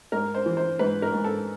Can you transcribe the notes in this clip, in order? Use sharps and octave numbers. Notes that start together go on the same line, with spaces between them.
G#2 A#4
C5
E3
C5
G#2 B4
A#4
G#2
A4